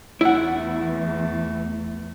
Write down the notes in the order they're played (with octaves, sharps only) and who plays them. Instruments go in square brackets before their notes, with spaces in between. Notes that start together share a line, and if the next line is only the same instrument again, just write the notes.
[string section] E2 [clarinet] A3 [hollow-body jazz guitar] E4 F#5